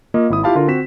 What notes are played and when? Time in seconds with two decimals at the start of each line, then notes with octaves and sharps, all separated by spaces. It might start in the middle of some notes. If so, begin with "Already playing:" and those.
0.14 A#3 F4 D#5
0.30 G#1 E4 D#6
0.43 E4 F4 G4 F5 A5 B5
0.55 D3 F4 A#4
0.68 C4 F#4 B6 E7